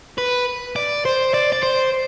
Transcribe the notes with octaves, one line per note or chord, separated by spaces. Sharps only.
B4
D5
C5
D5
D5
C5